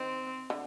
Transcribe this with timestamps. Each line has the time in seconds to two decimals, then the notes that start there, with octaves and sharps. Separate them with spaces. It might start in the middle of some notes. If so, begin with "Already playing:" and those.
Already playing: D#3 C4
0.50 D3